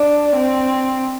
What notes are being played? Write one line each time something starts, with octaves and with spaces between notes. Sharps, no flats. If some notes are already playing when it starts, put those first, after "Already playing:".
Already playing: D4
C4